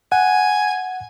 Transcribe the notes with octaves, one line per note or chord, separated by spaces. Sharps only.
F#5 G#5